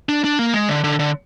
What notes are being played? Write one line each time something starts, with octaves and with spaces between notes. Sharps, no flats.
D4
D4
A#3
G#3
D3
D3
D3